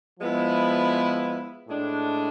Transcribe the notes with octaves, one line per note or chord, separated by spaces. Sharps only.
F3 G#3 B3 E4 B4
A2 G#3 D4